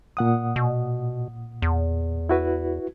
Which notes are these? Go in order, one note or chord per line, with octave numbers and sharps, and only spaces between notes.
A#2 F#5 D#6
B2
E2
E4 F#4 B4